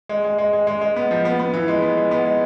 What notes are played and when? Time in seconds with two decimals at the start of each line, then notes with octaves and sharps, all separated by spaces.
0.09 G#3
0.25 G#3
0.38 G#3
0.53 G#3
0.67 G#3
0.81 G#3
0.96 B3
1.11 F3
1.25 B3
1.40 B3
1.54 E3
1.68 G#3
1.82 B3
1.97 G#3
2.11 B3
2.25 G#3